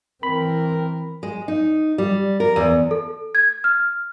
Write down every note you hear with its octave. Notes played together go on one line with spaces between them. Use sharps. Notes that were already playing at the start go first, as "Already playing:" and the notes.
E3 C4 A#4 B5
G#3
D#4
G3
A#4
E2
A4
G#6
F6